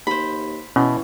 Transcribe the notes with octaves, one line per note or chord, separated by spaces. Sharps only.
D#2 C5 B5
B2 E3 C#4